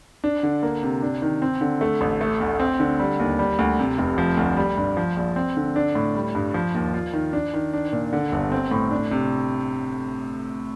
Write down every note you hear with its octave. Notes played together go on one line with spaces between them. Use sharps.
D4
D3
A#3
C3
D4
D#3
C4
D3
A3
A1
A3
D2
C4
D3
G3
D#2
G3
D2
C3
F1
F3
D2
G3
G2
F3
A#1
C4
D3
D4
A2
G3
G2
F3
D#2
F4
D#3
D4
D#3
D4
A#2
D3
G1
C4
A2
D4
C3